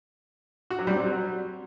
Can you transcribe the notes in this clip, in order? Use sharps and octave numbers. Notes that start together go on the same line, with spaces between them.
F#4
F#3
G3
C4
F#3